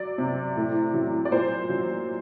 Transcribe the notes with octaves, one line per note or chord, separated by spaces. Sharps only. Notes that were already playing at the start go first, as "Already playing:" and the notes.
Already playing: F#3 D5
C3
A2
F#3
D5
A#2 C5
F#3